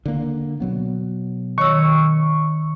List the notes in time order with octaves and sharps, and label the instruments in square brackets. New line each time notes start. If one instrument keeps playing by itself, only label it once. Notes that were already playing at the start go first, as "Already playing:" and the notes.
[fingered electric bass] D3 A#3
B2 F#3 B3
[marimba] D#3 C#5 E6 [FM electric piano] C#6